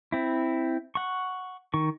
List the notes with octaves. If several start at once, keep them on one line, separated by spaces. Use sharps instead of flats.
C4 E4
F#5 C#6
D#3 C#6